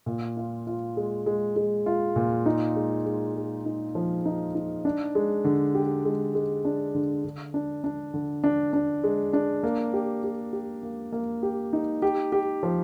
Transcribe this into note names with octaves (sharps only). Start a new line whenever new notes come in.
A#2
F4
F4
G#3
G#3
G#3
F4
A#2
D#4
G#3
G#3
G#4
D#4
F3
D#4
D#4
D4
G#3
D3
G4
G#3
G#3
D4
D3
D3
D4
D4
D3
D4
D4
G#3
D4
A#3
G4
G4
G4
A#3
A#3
G4
D#4
G4
G4
F3